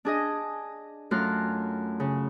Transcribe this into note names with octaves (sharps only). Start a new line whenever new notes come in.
D4 G#4 D#5
F#2 A3 F4 F6 F#6
C#3